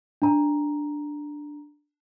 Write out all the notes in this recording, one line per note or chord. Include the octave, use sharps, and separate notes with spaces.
D4 A#5